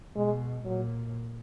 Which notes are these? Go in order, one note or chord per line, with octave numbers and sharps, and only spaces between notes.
B2 G#3
A#2 F#3